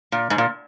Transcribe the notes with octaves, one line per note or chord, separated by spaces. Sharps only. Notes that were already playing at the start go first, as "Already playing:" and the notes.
A#2
G#2
A#2